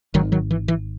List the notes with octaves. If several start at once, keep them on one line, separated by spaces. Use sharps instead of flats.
G#1 G#2 D#3 F#3
D#3 F#3
E3
E3